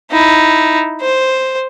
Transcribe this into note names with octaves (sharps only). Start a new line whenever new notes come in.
D#4 E4
C5